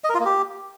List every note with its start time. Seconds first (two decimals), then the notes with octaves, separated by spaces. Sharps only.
0.04 D#5
0.09 A#4
0.15 F4
0.20 A#3
0.25 G4